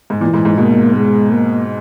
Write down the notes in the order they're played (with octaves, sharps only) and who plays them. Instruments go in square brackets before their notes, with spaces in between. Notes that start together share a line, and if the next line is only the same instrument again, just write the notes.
[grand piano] G#2
[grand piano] A#2 [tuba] E3
[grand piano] G#2
G#2
[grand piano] B2 [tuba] A#3
[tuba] G#3
A#3